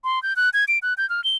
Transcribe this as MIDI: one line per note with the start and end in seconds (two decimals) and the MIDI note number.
0.04 0.22 84
0.23 0.36 91
0.36 0.50 90
0.53 0.65 92
0.68 0.79 98
0.82 0.94 90
0.98 1.08 91
1.10 1.23 89
1.24 1.37 103